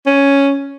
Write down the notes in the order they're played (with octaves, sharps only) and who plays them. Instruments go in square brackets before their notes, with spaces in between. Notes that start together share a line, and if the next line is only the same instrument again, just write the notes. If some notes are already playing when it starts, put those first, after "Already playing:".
[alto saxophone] C#4